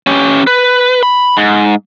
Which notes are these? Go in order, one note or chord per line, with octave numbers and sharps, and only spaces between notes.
C#4 G4
B4
B5
G#2